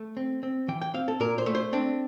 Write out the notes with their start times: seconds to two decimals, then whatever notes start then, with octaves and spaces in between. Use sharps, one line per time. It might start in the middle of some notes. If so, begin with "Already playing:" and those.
Already playing: A3
0.17 C4
0.43 C4
0.68 E3 G5
0.81 G5
0.94 C4 F5
1.08 A4
1.20 A#2 A#4
1.38 C5
1.46 A3
1.55 C5
1.73 C4 D4